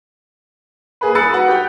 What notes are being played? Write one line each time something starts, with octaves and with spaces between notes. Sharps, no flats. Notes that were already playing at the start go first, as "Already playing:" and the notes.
A#3 G#4 B4
B5 D#6 E6 F#6 A6 C#7
F#4 B4 F#5
G4 G5